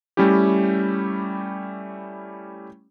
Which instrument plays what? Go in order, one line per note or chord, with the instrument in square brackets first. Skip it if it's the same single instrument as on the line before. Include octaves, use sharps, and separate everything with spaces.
[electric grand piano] G3 A3 C#4 E4 G4